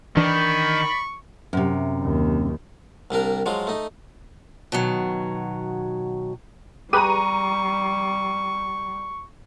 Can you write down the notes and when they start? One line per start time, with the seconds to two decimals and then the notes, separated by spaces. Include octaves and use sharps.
0.17 D#3 E3 D4 D5 B5 C#6
1.53 F#2 C3
2.02 D#2
3.11 C2 G3 D4 A#4
3.46 F3 F#3 G#3 F4
3.67 A3 D#4
4.72 B2 D#3 F#3
6.93 G3 G4 G#4 B4 A#5 C#6 D#7